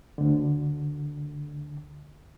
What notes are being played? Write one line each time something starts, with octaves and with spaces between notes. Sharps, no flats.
D2 D3